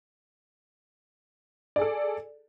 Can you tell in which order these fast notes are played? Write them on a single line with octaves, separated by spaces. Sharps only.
D5 G#4 A4